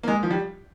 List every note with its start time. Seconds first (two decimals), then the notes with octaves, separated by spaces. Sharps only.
0.03 A#3
0.08 G#3
0.23 F3
0.31 G3